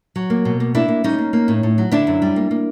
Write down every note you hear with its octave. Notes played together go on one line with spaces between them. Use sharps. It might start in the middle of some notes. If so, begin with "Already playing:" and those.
F#3
A#3
B2
A#3
A#3 D4 E4
A#3
G3 C#4 D#4
A#3
A#3
A2
A2
F#3
D3 D4 E4
F#2
G3
A#3
A#3